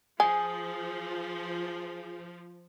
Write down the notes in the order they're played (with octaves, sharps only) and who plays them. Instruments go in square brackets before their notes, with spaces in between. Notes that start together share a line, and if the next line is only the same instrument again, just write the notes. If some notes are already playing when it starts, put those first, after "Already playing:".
[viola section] F3 [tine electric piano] G#4 [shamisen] G#5